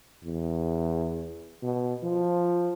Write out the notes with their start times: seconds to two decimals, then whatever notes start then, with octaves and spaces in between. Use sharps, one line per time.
0.24 E2
1.63 B2
2.03 F3